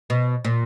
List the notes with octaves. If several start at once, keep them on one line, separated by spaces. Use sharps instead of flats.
B2
A#2